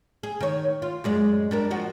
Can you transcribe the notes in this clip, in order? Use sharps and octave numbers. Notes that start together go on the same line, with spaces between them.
G#4
D#3 C#5
F4
F#2 G#3 D5
G3 D4 A#4
F3 F#4